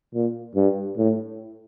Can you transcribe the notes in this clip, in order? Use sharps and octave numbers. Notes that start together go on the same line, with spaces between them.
A#2
G2
A2